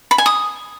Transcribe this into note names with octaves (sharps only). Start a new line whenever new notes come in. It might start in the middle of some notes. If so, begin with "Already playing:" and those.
B5
G#5
D#6